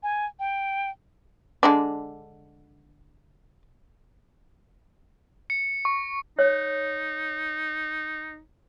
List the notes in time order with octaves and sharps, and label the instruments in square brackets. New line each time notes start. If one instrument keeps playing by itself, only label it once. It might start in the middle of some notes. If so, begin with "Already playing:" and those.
[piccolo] G#5
G5
[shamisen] D3 G#3 D4
[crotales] C#7
C#6
[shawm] D#4 [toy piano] C#5